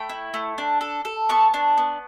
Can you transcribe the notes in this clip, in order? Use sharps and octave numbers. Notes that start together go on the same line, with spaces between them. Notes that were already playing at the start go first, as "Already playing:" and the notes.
Already playing: A3 G5 B5
E4
A3
D4
A4
A4
B3 A5 C#6
D4
B3